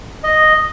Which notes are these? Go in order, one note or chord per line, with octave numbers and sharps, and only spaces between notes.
D#5